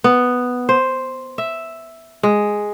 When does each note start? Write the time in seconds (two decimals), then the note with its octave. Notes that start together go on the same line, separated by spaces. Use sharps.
0.04 B3
0.69 C5
1.38 E5
2.23 G#3